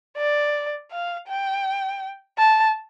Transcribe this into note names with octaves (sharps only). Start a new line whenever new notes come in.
D5
F5
G5
A5